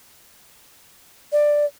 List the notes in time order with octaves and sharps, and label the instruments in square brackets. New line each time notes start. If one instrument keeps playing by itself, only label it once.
[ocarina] D5